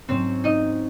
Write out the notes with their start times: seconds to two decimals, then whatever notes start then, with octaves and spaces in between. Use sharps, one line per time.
0.09 G#2 F#3 C4 C#4 C5
0.44 D#4 D#5